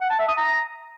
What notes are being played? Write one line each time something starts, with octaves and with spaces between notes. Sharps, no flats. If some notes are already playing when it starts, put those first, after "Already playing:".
F#5
A5
E5
D#6
A#5